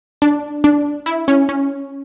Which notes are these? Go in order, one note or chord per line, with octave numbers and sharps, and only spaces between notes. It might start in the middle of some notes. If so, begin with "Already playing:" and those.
D4
D4
E4
C#4
C#4